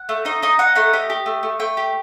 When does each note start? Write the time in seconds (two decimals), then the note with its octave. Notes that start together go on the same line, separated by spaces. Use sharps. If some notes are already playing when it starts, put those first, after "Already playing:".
Already playing: F#5
0.09 A3
0.25 D#4 D#5
0.42 D#4 D#5
0.59 D#4 F#5
0.76 A3 F#5
0.93 G4 D#5
1.10 G4
1.26 A3
1.43 A3
1.60 A3 G5
1.77 G4